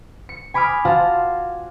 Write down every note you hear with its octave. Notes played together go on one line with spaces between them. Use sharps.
C#7
G#5 B5 D6 D#6 F6
F4 F#4 C5 F5 A5